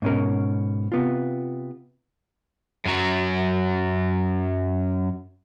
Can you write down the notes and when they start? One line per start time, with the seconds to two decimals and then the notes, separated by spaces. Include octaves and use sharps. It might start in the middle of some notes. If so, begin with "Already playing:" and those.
0.02 G#2 B2 C#4 A#4
0.92 C3 B3 F4
2.85 F#2 F#3